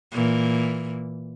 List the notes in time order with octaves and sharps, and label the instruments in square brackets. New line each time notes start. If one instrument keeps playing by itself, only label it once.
[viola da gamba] A#2 E3